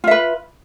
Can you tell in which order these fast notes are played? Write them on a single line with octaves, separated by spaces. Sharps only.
F4 E5 B4